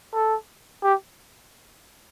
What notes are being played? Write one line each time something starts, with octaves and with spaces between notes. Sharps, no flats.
A4
G4